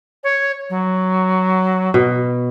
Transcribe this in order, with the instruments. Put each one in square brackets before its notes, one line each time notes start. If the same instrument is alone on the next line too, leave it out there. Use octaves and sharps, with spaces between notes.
[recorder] C#5
F#3
[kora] B2